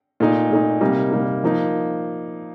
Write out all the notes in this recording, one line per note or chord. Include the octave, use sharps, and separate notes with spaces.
A#2 A3 D#4
A#2 A3 D#4
C3 G3 A#3 D#4
C3 G3 A#3 D#4
F3 A#3 D#4